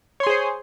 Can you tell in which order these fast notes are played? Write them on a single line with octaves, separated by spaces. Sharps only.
C#5 C6 G#4 C5